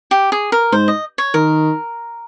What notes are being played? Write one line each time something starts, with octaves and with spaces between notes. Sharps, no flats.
G4
G#4
A#4
G#2 C5
D#5
C#5
D#3 A#4